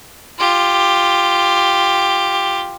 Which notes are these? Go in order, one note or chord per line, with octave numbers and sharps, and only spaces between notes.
F4 G4